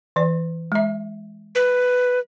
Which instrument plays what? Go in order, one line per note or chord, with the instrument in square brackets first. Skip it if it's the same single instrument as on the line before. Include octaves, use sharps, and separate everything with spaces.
[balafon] E3 D5
G#3 E5
[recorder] B4